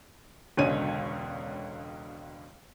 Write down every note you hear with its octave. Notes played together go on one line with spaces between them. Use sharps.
E1 C#2 B2 D3 C#5 D#7